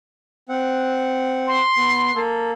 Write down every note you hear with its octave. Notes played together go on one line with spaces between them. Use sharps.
C4 F#5
C6
B3
A#3 A4